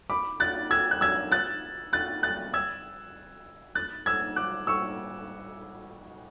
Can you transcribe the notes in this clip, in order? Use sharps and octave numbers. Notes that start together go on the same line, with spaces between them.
B5 D6
F#6 A6
E6 G#6
F#6
E6 G#6
F#6 A6
F#6 A6
F#6 A6
E6 G#6
F#6 A6
E6 G#6
D6 F#6
C#6 E6